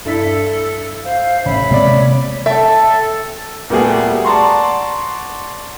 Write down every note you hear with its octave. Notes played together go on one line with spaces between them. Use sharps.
G2 E4 A4 B6
C5 F5
A1 C#5 E5 B5
C3 G#3 A#3 C4 D5
A4 E5 G5 A5
A#2 G3 A3 B3 F#4 G#4
D5 F#5 A5 A#5 C6 C#6